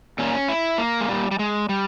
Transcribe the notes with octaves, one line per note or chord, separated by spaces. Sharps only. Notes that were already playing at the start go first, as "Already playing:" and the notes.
A#2 C#4
E4
A#3
G#3
A#2 G3
G3
G#3
G3